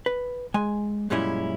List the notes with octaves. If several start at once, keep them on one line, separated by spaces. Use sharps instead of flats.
B4
G#3 G#5
F#2 A#2 G3 G#3 C#4 E4